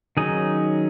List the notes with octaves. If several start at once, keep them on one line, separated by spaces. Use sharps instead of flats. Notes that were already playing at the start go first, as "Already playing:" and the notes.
D#3 F#3 C#4 D#4 G#4